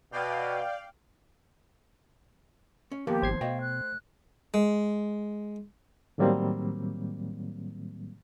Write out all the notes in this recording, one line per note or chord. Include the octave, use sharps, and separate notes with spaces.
B2 D5 F5 G5
C#4
D#2 F3 A#3 B3 G4
G#1 C5 G#6 C7
B2 A3 D#5 F5 G5
F#6
G#3
A2 D#3 F#3 G3 A#3 C4